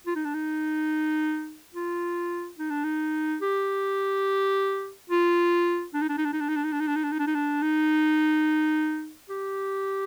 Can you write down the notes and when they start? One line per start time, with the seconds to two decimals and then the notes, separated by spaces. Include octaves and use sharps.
0.07 F4
0.16 D#4
0.25 D4
0.34 D#4
1.75 F4
2.59 D#4
2.70 D4
2.84 D#4
3.42 G4
5.10 F4
5.94 D4
6.02 D#4
6.09 D4
6.18 D#4
6.25 D4
6.33 D#4
6.40 D4
6.49 D#4
6.56 D4
6.64 D#4
6.72 D4
6.80 D#4
6.87 D4
6.96 D#4
7.04 D4
7.12 D#4
7.19 D4
7.27 D#4
7.35 D4
7.62 D#4
9.30 G4